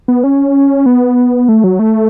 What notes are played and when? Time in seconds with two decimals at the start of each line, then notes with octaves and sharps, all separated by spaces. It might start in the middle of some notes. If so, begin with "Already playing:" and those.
0.08 B3
0.24 C#4
0.86 B3
1.49 A3
1.64 F#3
1.79 A3